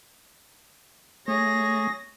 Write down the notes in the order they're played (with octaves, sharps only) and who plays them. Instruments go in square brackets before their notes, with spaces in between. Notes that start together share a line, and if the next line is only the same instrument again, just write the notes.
[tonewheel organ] A3 [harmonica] G#4 C#5 [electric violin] A#6